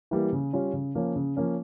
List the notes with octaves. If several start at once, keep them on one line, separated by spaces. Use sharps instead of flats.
E3 G3 A#3
C#3
G3 C#4 F4
C#3
F3 A#3 C#4
C#3
F3 A#3 C#4